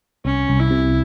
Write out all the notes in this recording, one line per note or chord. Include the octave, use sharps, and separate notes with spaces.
C2 C#4
C2
E4
C3